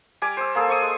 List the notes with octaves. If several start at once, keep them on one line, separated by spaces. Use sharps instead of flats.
G3 G#5 D6
C5 E6
A#3 G#4 A4
C5 C#6 D#6
G#3